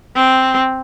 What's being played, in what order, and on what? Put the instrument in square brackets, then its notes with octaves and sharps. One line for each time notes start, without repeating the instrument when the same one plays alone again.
[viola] C4